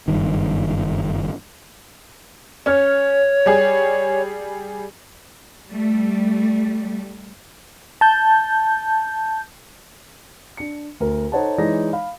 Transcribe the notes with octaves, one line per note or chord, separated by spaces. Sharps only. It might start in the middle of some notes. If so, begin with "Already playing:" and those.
F#1 G2 D#3
C#4 C#5 F6
G3 G#4
G3 A3
A5 G6
D4 C#7
D2 A#4
D#4 A4 C5 C#5 F#5 A5
E3 G#3 D#4 C#5 D5 A#6
F5 B5